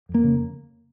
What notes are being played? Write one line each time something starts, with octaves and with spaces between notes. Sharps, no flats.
F2
A#3
C#3